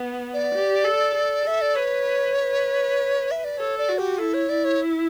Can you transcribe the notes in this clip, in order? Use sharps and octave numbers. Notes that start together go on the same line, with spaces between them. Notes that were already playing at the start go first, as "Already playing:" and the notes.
Already playing: B3
D5
G4
A4
A4
A4 E5
D5
B4 C#5
B4
E5
D5
A4 C#5
D5
F#4
G4
E4 A4
C#5
E4 D5
C#5